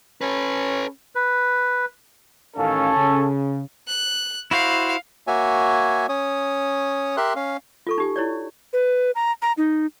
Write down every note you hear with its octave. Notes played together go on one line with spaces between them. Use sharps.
C#4 A4 B4
B4
A1 D#3 C#4 A4 F5
C#3
F#6
E4 F#4 C5 F5
A#3 F#4 C#5 E5 G#5
C#4 C#5 D#6
G4 A#4 E5 C6 F#6
C#4 F5
F4 A4 C#6
D#4 G4 G#5
E4 C#5 D5
B4
A#5
A#5
D#4